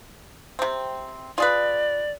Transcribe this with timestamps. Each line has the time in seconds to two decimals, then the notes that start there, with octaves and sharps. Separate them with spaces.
0.59 C3 C4
1.38 F4 G#4 B4 D5